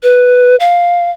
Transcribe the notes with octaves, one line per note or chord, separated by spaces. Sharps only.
B4
F5